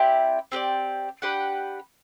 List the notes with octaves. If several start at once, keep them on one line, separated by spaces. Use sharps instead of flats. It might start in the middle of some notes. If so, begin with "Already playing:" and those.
Already playing: C4 E4 G4 D5
C4 G4 B4 D5
D4 G4 B4 F#5